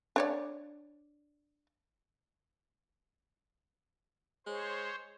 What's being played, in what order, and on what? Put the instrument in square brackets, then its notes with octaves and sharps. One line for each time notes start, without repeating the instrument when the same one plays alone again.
[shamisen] D4 C#5 D5
[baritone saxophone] G#3 [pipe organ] C5 C#5